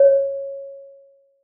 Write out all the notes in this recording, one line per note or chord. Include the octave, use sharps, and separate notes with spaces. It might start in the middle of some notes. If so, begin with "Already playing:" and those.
Already playing: C#5